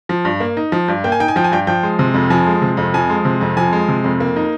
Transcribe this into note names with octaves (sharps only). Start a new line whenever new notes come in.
F3
G2
A#3
D#4
F3
G2
A#3 G5
G#5
D#4 G5
G#5
F3 G5
G#5
G2 G5
F3 G5
G#3
C3
F2
F3 G#5
G#3
C3
F2
F3 G#5
G#3
C3
F2
F3 G#5
G#3
C3
F2
A#3
D#4